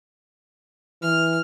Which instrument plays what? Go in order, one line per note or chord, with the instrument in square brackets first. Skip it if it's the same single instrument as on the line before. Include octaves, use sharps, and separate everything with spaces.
[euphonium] E3 [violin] F6